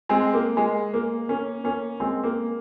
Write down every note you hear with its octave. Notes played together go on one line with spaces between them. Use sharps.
G#3 C4
A#3
G#3
A#3
A#3 C#4
A#3 C#4
G#3 C4
A#3